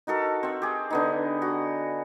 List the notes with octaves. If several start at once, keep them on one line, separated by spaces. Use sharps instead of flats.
D#4 F#4 A4 A#4
C4 E5
G4 G#4
D3 B3 D#4
F#4